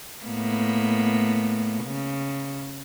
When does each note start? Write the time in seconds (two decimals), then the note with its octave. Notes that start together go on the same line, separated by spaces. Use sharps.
0.24 A2 A#3 B3
1.84 C#3